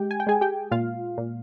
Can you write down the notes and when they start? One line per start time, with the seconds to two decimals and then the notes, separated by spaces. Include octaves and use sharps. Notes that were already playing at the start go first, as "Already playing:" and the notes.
Already playing: G#3 G4 G5
0.11 G#5
0.20 G5
0.27 G#3 G#4 G#5
0.41 G4 G5
0.71 A#2 F4 F5
1.18 A#2